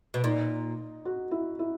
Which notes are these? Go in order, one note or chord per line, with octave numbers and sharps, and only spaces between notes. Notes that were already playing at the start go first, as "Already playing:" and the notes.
B2
A#2 D#4
F#4
E4
E4